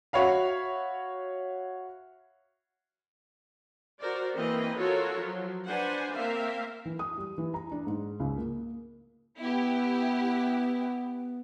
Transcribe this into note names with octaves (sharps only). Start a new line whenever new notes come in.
F#4 C#5 E5 F5 B5
F#4 A#4 C5 D5
E3 A#3 C4 B4 D#5
F4 F#4 A4 A#4 C#5
F3 F#3
D4 B4 C5 F#5 G#5
A#3 C4 A#4 E5 F5
E3
D#6
G3
E3
A#5
D4
G#2
C#2
A#3
B3 E4 G4